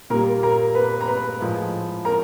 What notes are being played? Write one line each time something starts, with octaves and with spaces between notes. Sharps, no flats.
A#2 G3 A#3 A#4 A#5
A#4 A#5
B4 B5
A#5
B4 B5
A2 F3 G#3
A#4 A#5